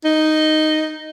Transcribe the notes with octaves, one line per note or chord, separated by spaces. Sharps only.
D#4